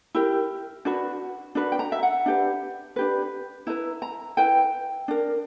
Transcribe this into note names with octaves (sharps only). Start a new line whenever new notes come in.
E4 G4 A#4
D4 F#4 B4
D4 F#4 B4
G5
A#5
E5
F#5
D4 G4 B4
D4 G4 B4
E4 B4 A#5
A#5
E4 B4 G5
D4 A#4